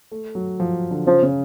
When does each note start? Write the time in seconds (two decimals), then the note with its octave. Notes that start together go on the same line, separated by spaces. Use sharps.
0.11 A3
0.35 F#3
0.60 F3
0.91 D3
1.07 C#3 F3
1.23 C#3